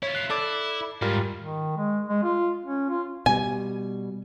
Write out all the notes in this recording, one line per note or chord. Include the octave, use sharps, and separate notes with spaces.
E4 F4 C#5
F#6 C7
E4 A4 D5 D6
G#2 G3 F4 A#4
D#3
G#3
G#3
F4
C#4
F4
B2 G3 G#5